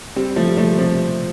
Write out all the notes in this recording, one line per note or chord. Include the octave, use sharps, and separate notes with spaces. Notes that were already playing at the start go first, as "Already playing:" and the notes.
G3 C4
F3 A3
G3
F3 A3
C3 F3